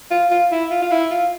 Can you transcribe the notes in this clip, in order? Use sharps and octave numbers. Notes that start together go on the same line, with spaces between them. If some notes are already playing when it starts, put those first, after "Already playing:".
F4
F4
E4
F4
F4
E4
F4